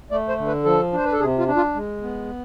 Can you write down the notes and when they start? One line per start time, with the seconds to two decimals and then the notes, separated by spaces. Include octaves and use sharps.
0.10 A3 D5
0.28 C5
0.38 D3
0.47 B4
0.65 F3 A4
0.93 D4 C5
1.05 B4
1.12 A4
1.20 C3 G#4
1.39 F4
1.47 D4
1.56 F4
1.75 G#3
2.02 B3